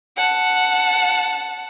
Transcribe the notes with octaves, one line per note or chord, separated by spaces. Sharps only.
F#5 A5